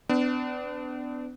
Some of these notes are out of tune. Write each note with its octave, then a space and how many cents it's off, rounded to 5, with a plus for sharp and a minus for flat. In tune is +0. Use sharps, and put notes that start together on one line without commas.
B3 +40 D4 +0